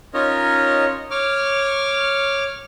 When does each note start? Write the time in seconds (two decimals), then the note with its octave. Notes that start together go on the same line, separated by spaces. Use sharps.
0.14 C#4 D#4 F4 A#4 C#5 D#5
1.11 C#5 D6 F6